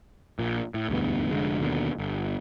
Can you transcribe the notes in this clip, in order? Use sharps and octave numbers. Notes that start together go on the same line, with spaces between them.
A#1 A#2
A2
E1 D2 G2 B3
F1 D3 G#3
D#2 B2 D3
G1